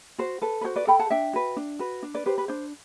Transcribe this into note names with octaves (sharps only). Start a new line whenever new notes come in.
F#4 C5
A4 B4
B4
F#4 C5
B4 D5
A4 G5 B5
F#5 A5
D4 E5 G5
F#4 B4
D4
F#4 B4
D4
B4 D5
G4 B4 C5
B4
D4 C5